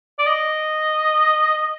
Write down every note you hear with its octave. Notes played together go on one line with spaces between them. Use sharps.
D5
D#5